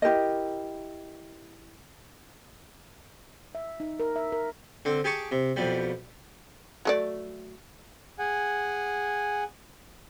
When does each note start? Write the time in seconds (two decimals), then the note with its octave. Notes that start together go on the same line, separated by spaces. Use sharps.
0.02 E4 G4 A#4 D#5
3.55 E5
3.80 D#4
4.00 A#4
4.16 E5
4.32 A#4
4.85 D3 C4
5.04 G4 G#4 A5 C#6
5.31 C3
5.56 F2 B2 G3
6.85 F#3 A3 D5
8.19 G#4 F#5 G#5